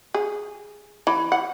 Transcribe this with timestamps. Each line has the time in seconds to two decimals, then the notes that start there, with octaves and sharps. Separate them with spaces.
0.14 G#4
1.07 E3
1.32 F#5